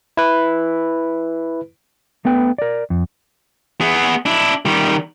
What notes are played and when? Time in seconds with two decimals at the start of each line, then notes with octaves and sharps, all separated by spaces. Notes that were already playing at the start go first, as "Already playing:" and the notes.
0.17 E4 B4
2.25 A3 B3 B4 G5
2.58 A#4 D5
2.90 F2
3.81 B3 G#4
4.26 D4 E4
4.66 D#3 G3